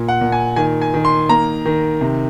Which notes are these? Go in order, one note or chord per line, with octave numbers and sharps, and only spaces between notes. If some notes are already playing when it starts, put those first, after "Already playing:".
Already playing: A#2
F#5
A#2
G#5
D#3 G#5
G#5
D#3
C6
A#3 A#5
D#3
C3